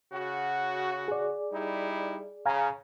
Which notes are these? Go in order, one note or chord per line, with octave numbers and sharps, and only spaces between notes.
C#3 F#4
G#4 D5
G3 D#4 E4
C#3 F5 G#5 A#5